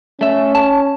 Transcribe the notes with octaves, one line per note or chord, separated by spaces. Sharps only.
A3 C#4 E5
A5